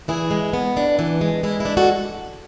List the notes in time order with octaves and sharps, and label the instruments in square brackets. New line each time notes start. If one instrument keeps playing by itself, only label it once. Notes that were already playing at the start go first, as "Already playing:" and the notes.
[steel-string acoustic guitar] E3 E4 G#4
G#3
B3
A2 D4
E3
G#3
G#3 E4
D4 E4
F#4 A4